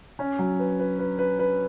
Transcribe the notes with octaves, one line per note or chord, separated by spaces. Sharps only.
C#4
F#3
B4
B4
B4
B4
B4